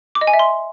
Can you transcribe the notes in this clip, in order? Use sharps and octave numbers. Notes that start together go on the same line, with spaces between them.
D6
D#5
G#5
E5
C6